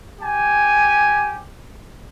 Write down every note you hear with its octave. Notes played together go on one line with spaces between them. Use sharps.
G4 G#5